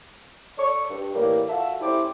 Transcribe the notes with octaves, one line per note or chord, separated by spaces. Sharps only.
A4 D5 C#6
G2
A2 E3 G3 A#3
F4 F#4 A4 E5
A3 C#4 E4 G4 C5 D6